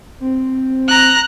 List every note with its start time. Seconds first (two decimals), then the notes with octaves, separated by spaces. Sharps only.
0.20 C4
0.88 A#5 F#6